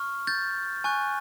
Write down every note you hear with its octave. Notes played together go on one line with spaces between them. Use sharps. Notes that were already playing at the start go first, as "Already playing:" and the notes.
Already playing: C#6 F6
G6 A6
G#5 C#6 F#6